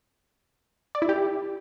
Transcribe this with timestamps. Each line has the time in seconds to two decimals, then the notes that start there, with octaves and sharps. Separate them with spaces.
0.95 D5
1.02 E4
1.09 G4